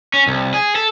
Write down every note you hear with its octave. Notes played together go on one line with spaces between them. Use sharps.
C#4
C2
G#4
A4